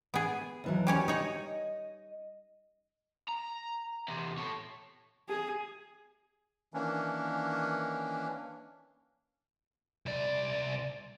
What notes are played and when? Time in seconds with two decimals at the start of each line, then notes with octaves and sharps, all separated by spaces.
0.14 B3 G#4
0.64 D#2 E3 F#3
0.87 G3 C#4 C#5
1.08 D#4 C#5 D#5
3.28 A#5
4.08 E2 C3
4.38 A4 C#5
5.29 G#4
6.74 D#3 E3 A#3 C#4 D4
10.06 C2 D5